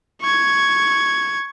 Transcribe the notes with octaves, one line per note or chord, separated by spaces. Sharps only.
C#6 G#6